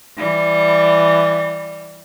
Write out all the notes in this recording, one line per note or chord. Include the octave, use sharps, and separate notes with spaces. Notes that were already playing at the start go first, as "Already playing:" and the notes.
E3 G3